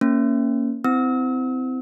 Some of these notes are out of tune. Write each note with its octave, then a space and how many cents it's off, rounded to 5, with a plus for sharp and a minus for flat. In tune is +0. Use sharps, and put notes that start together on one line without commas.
A#3 +0 C#4 +0
C4 -25 E4 +0 E6 -40